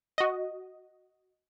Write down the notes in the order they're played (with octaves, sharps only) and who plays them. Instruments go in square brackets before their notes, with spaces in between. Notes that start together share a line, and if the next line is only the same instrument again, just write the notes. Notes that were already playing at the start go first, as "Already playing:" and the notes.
[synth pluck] F#4 D#5